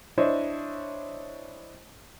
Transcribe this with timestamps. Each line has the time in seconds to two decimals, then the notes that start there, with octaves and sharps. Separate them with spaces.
0.18 D4 E4 C5 C#5 D#5